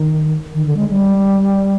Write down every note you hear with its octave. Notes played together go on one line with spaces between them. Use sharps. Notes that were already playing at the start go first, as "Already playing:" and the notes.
Already playing: D#3
D#3
D3
G#3
G3